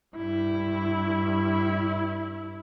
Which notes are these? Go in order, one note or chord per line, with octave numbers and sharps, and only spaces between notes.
G2 E4